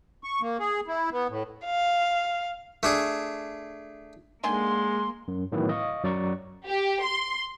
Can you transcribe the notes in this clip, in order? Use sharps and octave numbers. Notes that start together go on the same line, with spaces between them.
C#6
A#3
G#4
E4
B3
A2
F5
A3 D4 G#4
D3 D#3 G#3 A#3 G#5 C6
F#2
A2 D#3 E3 F#3 B3 E4
D#5 F5 C#6
F#2 F#3 D5 A#5 C#6
G4
C6